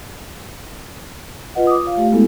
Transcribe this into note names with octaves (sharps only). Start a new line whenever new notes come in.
F4 B4 D#5 F#5
D6 D#6
F4 C#5 F5
A3 G4
G#3 A3 B3 E4 F#4 A4